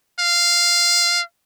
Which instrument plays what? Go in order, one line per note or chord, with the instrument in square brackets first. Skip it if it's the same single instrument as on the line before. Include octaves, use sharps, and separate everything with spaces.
[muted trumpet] F5